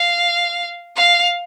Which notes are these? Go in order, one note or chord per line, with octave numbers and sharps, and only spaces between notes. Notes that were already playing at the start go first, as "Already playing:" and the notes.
Already playing: F5
F5